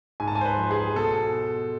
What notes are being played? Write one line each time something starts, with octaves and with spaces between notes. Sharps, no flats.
G#2 G#5
A5
G#5
C5
B4
F3
G#4
B2 A4